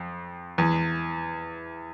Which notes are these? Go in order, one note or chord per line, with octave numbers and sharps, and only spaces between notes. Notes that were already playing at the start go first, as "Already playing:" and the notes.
Already playing: F2
E2